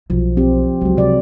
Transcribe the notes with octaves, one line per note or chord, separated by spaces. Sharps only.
B1 F3
C4 G4
C#2 F#3 G#3
C3 D5